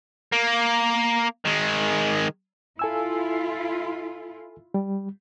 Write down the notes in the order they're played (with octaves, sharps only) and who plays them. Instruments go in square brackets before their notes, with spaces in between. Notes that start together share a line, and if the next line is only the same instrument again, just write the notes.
[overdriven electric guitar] A#3
D#3 G#3
[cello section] E4 F4 [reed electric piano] A4 G#5 E6
[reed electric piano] G3